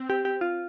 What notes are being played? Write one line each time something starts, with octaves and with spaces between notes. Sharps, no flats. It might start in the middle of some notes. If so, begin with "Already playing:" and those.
Already playing: C4
G4
G4
F4